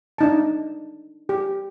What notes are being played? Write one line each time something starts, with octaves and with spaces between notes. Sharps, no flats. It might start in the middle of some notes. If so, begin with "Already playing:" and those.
D4 D#4 A5
G4